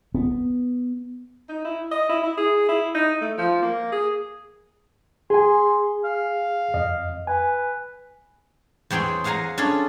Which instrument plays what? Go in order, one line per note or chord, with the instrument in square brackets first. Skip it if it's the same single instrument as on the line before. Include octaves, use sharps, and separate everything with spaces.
[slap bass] B3
[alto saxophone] D#4
E4
D#5
E4
E4
G#4
E4
D#4
A3
F3
A#3
G#4
[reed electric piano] G#4 G#5 [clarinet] C6
[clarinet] F5
[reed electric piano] F2 D#5
[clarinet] B4 [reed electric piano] G#5
[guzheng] E2 C4 G#4 C#5 G5
G#4 F5 F#5 G#5 A#5
C#4 D4 F4 G#4 A4